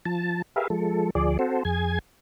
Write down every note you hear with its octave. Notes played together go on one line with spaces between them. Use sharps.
F3 A5
G4 G#4 A#4 B4 E5 F5
F3 G#3 A4
D2 F3 G#4 D5
C4 F#4 A4 C5
F2 G#4 G#5 G#6